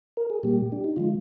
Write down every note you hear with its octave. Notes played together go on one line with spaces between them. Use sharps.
A#4
G#4
A#2 G3 A#3 G4
D4
D#4
D3 F3 G#3 F4